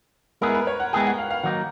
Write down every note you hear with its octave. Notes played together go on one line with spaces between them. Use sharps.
G#3 B3 E4 G#4 A#4
B4
C#5
F#5
G#3 B3 E4 G#4 G5
F#5
F5
F5
D#3 F#3 A#3 D#4 F#5